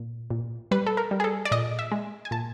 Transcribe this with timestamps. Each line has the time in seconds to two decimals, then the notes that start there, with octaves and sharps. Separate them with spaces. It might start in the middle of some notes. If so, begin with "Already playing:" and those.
Already playing: A#2
0.30 A#2
0.71 G3 B4
0.86 A4
0.97 A#4
1.11 G3
1.20 G#4
1.24 A4
1.45 D5
1.51 A#2 D#5
1.79 E5
1.92 G#3
2.25 G#5
2.31 A#2 A5